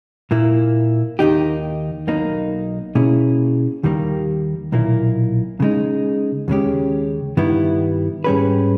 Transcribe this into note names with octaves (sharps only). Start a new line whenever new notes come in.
A#2 A#3 E4
D#2 D#3 A#3 D#4 G4
B1 B2 A#3 D#4
B2 A#3 C#4 E4 G#4
D#2 D#3 G3 A#3
B1 A#2 A#3 E4
C#3 G#3 D#4
D#2 C#3 G#3 C#4 G4
G2 D#3 G3 B3 E4
G#2 G3 C#4 G#4 B4